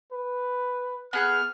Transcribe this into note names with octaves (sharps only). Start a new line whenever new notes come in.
B4
B3 G#4 F6 F#6